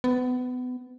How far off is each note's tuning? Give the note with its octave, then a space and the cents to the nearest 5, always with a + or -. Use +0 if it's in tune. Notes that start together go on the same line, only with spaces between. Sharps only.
B3 +25